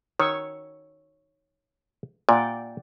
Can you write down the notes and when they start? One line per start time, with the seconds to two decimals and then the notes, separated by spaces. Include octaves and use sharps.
0.20 D#3 C#5 C#6 E6
2.29 A#2 D5 F#5 G5